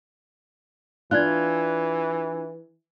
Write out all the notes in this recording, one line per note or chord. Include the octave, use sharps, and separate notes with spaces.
E3 D4 F4 F#6 G#6